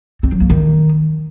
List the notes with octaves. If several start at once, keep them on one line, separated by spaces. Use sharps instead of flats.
C4
F#3
A#3
D#3